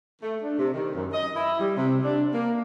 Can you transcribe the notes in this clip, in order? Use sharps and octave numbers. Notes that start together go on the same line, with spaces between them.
A3
D4
C3
D#3
F#2
D#5
E4
G3
C3
D4
A#3